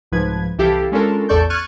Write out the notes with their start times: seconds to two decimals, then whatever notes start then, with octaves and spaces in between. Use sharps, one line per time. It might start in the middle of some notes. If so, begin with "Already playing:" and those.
0.12 C2 G#2 F3 B4 G#6
0.58 C2 E3 E4 G4 A4 F5
0.92 G#3 C#4 D4 F4 A4 A#4
1.29 A1 E2 A4 D5 C#6 G6
1.50 C#6 F6 F#6 G#6 A6 D#7